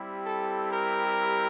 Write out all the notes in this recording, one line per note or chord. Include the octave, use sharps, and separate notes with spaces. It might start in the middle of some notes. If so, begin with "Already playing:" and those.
Already playing: G3 C4 E4 G4
A4
A#4